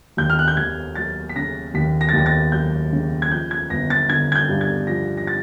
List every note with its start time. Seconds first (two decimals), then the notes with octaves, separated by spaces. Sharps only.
0.17 D#2 G6
0.30 F6
0.39 F#6
0.48 G6
0.57 D#2 G#6
0.95 F#3 A6
1.29 B6
1.36 C#3 A#6
1.74 D#2 B6
2.01 A#6
2.09 A6
2.13 D#2
2.18 A#6
2.26 A6
2.52 F#3 G6
2.92 C#3
3.22 G#6
3.31 F3 G6
3.51 G#6
3.70 G1 A#6
3.90 A6
4.09 D3 G#6
4.32 G#6
4.35 G6
4.49 G2
4.61 G#6
4.87 F3 A#6
5.17 A#6
5.27 A6